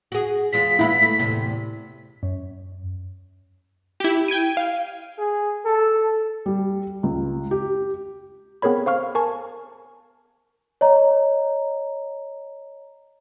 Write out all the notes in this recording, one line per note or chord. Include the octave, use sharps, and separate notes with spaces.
F#4 G#4
E2 G#3 F4 B6
G#3 A3 B3 E4 B5
A3
E2 A2 C3
F#2
E4 G4
G5 G#6 D7 D#7
F5
G#4
A4
G3
C#2
G4
B3 C4 G#4 A#4 C#5 B5
C5 F5 C#6 F6
A#4 G#5 A5 C#6
C#5 D#5 A#5